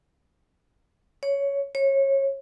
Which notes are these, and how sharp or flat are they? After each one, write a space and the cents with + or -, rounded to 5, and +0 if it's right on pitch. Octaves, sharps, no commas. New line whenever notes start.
C#5 +10
C#5 -25